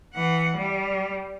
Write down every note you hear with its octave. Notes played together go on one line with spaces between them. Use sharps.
E3 F#5
G3